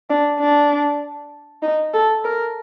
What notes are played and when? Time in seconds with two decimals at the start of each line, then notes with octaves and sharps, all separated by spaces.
0.10 D4
0.40 D4
1.63 D#4
1.94 A4
2.24 A#4